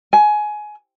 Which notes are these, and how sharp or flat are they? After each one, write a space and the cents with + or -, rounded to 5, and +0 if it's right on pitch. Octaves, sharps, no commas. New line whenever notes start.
G#5 +20